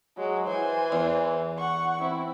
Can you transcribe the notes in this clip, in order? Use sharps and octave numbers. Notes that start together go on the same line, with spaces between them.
F#3 G#3
E3 C5 G#5
E2
F#5 C#6
C4 E4